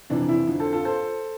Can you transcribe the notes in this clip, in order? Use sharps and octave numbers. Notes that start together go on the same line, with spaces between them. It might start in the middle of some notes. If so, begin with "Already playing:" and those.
F2 C3 E3 D4
E4
F2 D3 F3
A4 C5
F4 A4
A4 C5